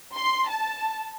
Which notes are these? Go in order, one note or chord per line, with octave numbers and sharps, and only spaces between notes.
C6
A5